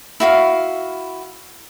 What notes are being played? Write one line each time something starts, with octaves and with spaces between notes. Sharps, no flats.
E4 F#4 F5